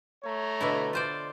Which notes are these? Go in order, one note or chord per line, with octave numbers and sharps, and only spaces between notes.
A3 C#5 A#5
B2 D3 E4
F4 C5 D5